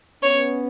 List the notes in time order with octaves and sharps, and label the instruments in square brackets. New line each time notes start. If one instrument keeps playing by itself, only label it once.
[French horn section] B3 C#4 [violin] C#5